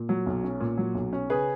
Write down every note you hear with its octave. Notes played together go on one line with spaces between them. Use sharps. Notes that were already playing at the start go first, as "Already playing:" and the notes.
Already playing: A#2
F#3
B1
C#4
A#2
F#3
B1
C#4
C#3 G#4 B4